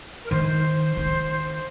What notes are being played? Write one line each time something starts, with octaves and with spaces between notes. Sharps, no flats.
A#4
D#3 C5
D#3